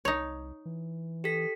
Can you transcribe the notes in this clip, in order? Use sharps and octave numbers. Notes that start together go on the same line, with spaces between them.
C2 D#4 C#5
E3
G4 A4 B6